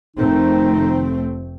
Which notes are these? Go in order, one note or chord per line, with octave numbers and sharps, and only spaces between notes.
F1 D#3 A3 C4 D#4